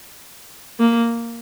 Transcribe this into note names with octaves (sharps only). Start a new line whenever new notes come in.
A#3